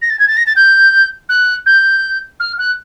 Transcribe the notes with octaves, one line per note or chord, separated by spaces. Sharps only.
A#6
A6
G#6
A6
A#6
A6
G6
F#6
G6
F6
F#6